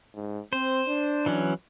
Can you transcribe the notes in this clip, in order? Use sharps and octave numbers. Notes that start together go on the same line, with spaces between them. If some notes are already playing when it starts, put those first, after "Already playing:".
G#2
C4 C5
D4
E3 F#3 C#4